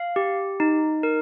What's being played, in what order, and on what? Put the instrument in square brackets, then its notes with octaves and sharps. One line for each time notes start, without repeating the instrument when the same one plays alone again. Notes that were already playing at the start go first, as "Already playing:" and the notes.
Already playing: [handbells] F5
G4
D#4
A#4